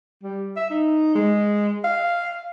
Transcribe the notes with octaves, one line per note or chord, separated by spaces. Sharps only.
G3
E5
D#4
G#3
F5